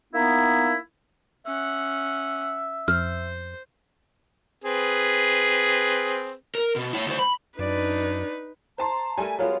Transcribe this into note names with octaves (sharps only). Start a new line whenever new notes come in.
A#3 B3 D#4 E4
C#4 E5 F#5
F2 C5 F6
C4 G#4 B4
A#4
B2
E4 C#5
D2 C5
B5
F#2 D4 D#4 B4 D5
C5 A5 A#5 C6
G3 A3 A#4 G#5
F#3 G#3 B3 F4 G#4 A#4